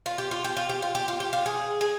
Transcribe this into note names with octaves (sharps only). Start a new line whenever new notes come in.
F4
G4
F4
G4
F4
G4
F4
G4
F4
G4
F4
G#4
G#4